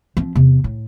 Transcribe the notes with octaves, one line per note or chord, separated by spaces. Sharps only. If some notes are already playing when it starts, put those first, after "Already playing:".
F3 C4
E2 C3
A2